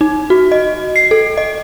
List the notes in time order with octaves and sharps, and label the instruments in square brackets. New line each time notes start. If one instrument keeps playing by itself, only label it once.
[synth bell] D#4
F#4
D#5
C7
A4
D#5